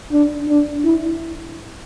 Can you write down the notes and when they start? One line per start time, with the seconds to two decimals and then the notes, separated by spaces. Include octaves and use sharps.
0.12 D4
0.48 D4
0.85 E4